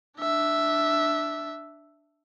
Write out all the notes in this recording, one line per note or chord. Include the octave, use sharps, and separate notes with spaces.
D4 E5